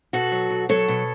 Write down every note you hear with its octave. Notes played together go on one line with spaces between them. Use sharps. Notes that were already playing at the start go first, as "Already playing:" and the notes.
B2 F#4 A4
F#3
B2
F#3 A4 C#5
B2